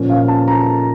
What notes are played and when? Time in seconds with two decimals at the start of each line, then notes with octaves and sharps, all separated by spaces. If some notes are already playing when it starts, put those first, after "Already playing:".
Already playing: A#2 F3 C#4
0.10 F5
0.28 A5
0.48 A#5